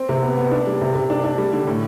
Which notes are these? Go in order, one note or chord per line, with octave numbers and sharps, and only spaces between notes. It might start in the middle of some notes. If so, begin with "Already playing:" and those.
Already playing: C4
C3
B3
B3
D4
G3
C3
C3
D4
D4
G3
D3
A2